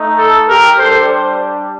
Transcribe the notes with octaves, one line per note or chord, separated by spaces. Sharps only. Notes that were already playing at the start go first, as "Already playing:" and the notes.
Already playing: A3 D#4
A4
G4 A#4
G3 D4 G4 A4 C5
C5